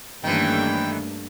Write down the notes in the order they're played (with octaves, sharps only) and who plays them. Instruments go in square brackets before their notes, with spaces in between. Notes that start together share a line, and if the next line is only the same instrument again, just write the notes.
[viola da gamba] G2 [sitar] D#3 E3 [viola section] A3 A#3 C#4 [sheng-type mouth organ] G5